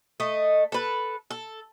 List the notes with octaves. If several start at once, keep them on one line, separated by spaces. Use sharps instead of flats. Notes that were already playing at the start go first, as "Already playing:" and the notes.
A3 D#5
A4 B4
A4